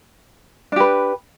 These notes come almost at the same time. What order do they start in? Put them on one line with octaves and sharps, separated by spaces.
D4 G4 B4